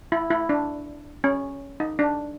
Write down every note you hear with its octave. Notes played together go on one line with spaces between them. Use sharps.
E4
E4
D4
C#4
D#4
D4